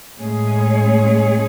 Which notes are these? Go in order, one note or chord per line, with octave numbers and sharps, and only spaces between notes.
A2 G#3 C#4 G#4 C#5